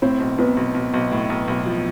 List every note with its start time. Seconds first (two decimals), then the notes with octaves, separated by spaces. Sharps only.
0.02 A2 C4
0.20 B1
0.38 B1 B3
0.57 B1
0.74 B1
0.94 B1
1.11 A2
1.30 B1
1.48 B1
1.66 F3